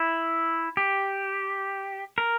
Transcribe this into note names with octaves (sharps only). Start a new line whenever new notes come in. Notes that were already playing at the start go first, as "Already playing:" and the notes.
Already playing: E4
G4
A#4